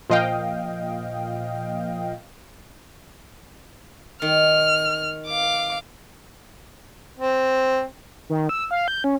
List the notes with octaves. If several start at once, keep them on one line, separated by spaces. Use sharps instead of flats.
A#2 F3 D#5 F5 G5
D#3 F6
F5 D6
C4
D#3
E6
F5
G6
C#4